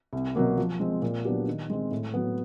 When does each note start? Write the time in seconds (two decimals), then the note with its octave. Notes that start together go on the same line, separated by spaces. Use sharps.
0.13 C2
0.36 B2 F#3 A#3
0.57 F3
0.80 G#3 C4
1.02 A#2
1.25 F#3 B3 D4 G4
1.48 D#3
1.70 G#3 C4
1.91 A2
2.14 F#3 B3